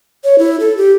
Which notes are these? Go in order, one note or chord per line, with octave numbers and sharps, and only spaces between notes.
C#5
E4
A4
G4